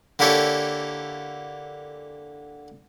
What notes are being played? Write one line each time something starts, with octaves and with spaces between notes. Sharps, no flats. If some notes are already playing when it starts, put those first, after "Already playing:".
D3 A#3 E4 G4 A4 C#5